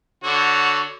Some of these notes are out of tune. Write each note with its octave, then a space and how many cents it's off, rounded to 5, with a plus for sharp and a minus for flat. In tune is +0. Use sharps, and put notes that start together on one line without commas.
D3 +0 F#4 +0 C#5 +15